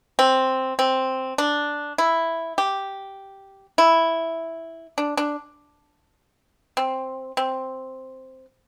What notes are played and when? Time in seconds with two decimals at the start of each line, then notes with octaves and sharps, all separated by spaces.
0.19 C4
0.79 C4
1.38 D4
1.98 E4
2.58 G4
3.78 E4
4.98 D4
5.17 D4
6.77 C4
7.37 C4